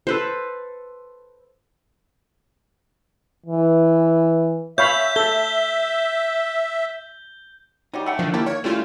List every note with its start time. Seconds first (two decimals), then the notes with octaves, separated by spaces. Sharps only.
0.07 A4 B4 C5
3.46 E3
4.78 C#5 E5 F5 B5 G6
5.16 A4 G6 G7
7.94 F#3 G3 D#4 G4
8.06 A3 F#5 G5
8.19 D3 D#3 F3
8.34 A#3 E4 G4 A5
8.46 A#3 C#5
8.64 G3 A3 C#4 E4 F4